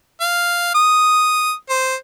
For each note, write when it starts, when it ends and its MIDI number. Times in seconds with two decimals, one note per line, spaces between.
0.21 0.74 77
0.75 1.52 87
1.70 1.95 72